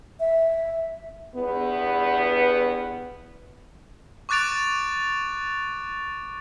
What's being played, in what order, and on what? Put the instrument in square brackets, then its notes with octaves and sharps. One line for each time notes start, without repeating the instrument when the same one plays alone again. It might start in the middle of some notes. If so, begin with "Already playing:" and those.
[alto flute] E5
[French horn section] E2 G2 B3
[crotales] C#6 D6 F#6 A6 D7 F7